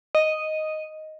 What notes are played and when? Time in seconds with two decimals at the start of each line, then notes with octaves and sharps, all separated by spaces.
0.15 D#5